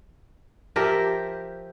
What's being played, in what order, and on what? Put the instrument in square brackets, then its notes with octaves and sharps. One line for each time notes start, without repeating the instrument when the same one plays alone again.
[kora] F3 G4 A#4 E5